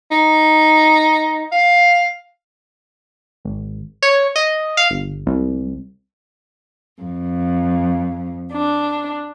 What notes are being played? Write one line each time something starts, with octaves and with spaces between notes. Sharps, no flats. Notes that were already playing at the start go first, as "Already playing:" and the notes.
D#4
F5
G#1
C#5
D#5
F5
G1
C2
F2
D4